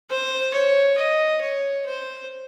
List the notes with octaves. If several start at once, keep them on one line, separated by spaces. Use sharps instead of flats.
C5
C#5
D#5
C#5
C5